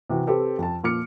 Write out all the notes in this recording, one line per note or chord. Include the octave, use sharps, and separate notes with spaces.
C3 E3 F#4
C4 G4 A4 B4
F2 A5
A#2 F3 D6 F6 C#7